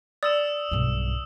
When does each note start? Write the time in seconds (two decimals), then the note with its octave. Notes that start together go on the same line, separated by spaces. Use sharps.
0.23 D5 D#6 E6 E7
0.71 B1 G2